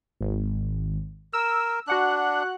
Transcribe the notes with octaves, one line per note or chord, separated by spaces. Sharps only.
G#1
A#4 E6
D4 F#4 F#5 F#6